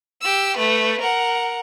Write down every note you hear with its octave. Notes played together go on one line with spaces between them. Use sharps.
G4 E6
A3 B4
A#4 F#5